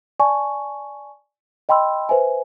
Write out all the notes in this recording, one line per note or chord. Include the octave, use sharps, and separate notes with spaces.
D5 G#5 A5 C#6
D#5 G5 B5 C6 E6
B4 C5 E5 G#5